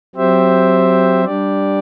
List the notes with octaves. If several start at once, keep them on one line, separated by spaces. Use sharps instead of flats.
F#3 C4 G4 C5 E5
G3 D4 G4 D5